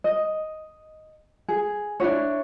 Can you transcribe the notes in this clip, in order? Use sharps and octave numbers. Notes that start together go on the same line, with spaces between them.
D#5
G#4
D4 E4 F#4 C#5